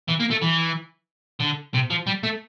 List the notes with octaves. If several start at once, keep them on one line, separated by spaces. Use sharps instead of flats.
E3
A#3
A3
E3
D3
C3
F3
G3
A3